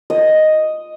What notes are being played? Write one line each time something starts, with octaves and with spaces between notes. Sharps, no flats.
D#5